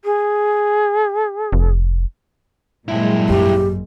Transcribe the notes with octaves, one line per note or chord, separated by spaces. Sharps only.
G#4
F1
G2 A#2 F#3 G#3 E4
G#1 F#2 G4